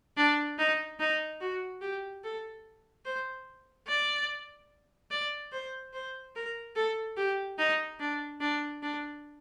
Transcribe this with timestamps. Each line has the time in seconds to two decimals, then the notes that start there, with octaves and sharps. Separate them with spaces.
0.17 D4
0.58 D#4
1.00 D#4
1.41 F#4
1.81 G4
2.23 A4
3.05 C5
3.88 D5
5.11 D5
5.52 C5
5.93 C5
6.35 A#4
6.76 A4
7.17 G4
7.58 D#4
8.00 D4
8.40 D4
8.82 D4